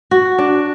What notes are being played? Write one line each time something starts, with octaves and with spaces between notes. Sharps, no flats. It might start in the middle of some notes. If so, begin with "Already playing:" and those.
F#4
D4